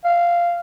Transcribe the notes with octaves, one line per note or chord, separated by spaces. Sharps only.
F5